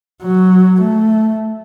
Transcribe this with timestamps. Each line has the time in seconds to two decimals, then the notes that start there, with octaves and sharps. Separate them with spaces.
0.23 F#3
0.81 A3